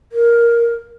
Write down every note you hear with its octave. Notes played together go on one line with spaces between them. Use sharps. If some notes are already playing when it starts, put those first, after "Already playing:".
A#4